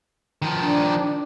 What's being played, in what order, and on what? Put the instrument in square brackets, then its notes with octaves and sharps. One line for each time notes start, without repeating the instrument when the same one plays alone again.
[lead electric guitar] D#3 F3
[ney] D4